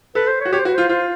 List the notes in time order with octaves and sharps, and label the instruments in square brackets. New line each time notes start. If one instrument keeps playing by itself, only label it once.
[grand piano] A4 [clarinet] B4
[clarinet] C5
C#5
[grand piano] F#4
[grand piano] G4 [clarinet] C#5
[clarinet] C5
[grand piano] F#4 [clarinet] B4
[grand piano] F4 [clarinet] C5
[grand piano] F4 [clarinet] C5